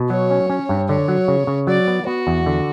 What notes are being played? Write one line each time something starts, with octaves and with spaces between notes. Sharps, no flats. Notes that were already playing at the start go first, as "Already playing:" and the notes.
Already playing: B2
F#3 C#5
C#4
C#4
G2
D3 C#5
F#3
C#3
C#3
F#3 D5
B3
B3 F#4
E2
D3